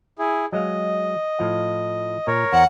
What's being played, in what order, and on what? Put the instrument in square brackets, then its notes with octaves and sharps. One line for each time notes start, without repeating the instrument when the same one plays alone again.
[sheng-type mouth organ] E4 G#4
[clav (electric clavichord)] F#3 G#3 F5 [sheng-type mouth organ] D#5
[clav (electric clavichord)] A2 F3 F5
[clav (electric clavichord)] A#2 [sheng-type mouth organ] A#4 C#5
[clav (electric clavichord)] E2 C5 A#5 [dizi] F#5